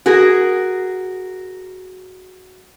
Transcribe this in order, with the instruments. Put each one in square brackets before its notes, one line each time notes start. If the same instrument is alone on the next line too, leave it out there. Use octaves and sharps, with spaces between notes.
[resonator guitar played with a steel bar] F#4 G#4 A#4